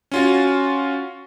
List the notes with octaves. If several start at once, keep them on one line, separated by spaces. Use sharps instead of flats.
C#4 F4 F#4